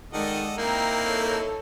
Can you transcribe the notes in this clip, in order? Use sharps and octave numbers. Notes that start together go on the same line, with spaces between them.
D#3 G#3 A4 D5 D#5 F#5
A#3 C4 D#4 E4 G5 A#5
A4 C#5